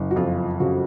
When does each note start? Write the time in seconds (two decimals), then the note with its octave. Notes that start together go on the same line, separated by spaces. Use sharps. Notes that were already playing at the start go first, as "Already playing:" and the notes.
Already playing: F#1
0.11 F#4
0.16 F2 F4
0.60 C#3 F#4